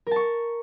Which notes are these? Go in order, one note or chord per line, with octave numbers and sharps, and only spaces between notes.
A#4 A5 C#6